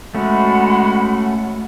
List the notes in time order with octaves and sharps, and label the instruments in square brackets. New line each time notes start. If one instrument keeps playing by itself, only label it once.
[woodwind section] G#3 [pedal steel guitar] A3 C#4 [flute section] F#4 F#5 B5